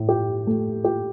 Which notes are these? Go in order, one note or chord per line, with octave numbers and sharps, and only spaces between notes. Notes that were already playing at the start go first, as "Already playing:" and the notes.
Already playing: A2
G4
A3
G4